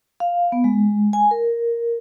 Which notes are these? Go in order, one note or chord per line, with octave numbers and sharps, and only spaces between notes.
F5
B3
G#3
G#5
A#4